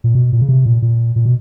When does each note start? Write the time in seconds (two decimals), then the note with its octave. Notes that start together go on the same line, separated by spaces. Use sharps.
0.04 A#2
0.15 B2
0.32 A#2
0.41 C#3
0.49 C3
0.66 A#2
0.82 A#2
1.16 A#2
1.25 B2